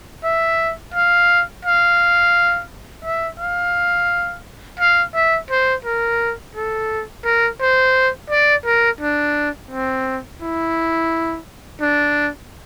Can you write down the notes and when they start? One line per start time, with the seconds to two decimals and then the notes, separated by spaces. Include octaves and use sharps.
0.24 E5
0.94 F5
1.65 F5
3.05 E5
3.40 F5
4.80 F5
5.15 E5
5.51 C5
5.85 A#4
6.55 A4
7.25 A#4
7.61 C5
8.30 D5
8.65 A#4
9.01 D4
9.71 C4
10.41 E4
11.81 D4